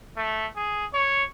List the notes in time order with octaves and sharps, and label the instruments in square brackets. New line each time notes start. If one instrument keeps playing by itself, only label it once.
[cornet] A3
G#4
C#5